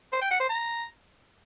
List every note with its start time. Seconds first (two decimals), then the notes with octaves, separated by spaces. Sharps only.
0.12 C5
0.22 G5
0.31 F#5
0.40 C5
0.49 A#5